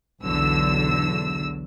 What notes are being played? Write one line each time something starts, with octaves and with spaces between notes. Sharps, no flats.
B1 E2 D3 F#3 E6